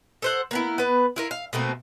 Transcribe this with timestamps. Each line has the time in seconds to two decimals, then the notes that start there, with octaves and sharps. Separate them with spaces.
0.22 A4 C5 F#5
0.51 A#3 B3 E4
0.78 B3 B4
1.16 E4 F4 A#4
1.31 F5
1.53 B2 A3 A#3 C4